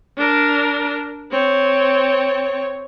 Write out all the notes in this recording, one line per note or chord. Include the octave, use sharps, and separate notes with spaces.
D4 A#4
C4 C#5